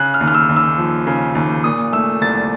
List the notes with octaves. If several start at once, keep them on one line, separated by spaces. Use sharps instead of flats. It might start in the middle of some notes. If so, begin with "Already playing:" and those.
Already playing: C#3 F#6
F6
D#2
F6
E6
D#2
E6
F3
C#3
D#2
A#2 D#6
A3 E6
C2 A6